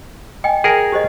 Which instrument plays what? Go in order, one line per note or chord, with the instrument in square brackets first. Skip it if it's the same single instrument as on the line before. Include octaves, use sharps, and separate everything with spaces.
[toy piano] D#5 G5 G#5
[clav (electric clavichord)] G#4 A#4 [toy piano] G5
[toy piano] G4 C5 D#5